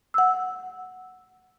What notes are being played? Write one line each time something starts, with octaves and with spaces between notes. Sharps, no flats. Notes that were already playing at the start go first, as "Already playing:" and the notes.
F#5 E6